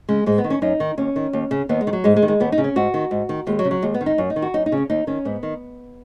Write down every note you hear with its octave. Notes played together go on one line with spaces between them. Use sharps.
C#3 G#3
G#2 G#3
B3
D#3
C#4
F#2 D#4
D#3
D#2 C#4
D#3
D#2
C#3
D#2 B3
G#3
D#3
F#3
G#2 G#3
G#3
D#3
G#3
D#2 B3
D#4
C#3
C#4
G#2 F#4
D#3
G#2
D#3
D#2 G#3
F#3
C#3
F#3
D#2 G#3
B3
D#3
D#4
F#2
D#4
D#3
F#4
F#2 D#4
D#4
C#3
C#4
D#2 D#4
D#3 C#4
G#2 B3
D#3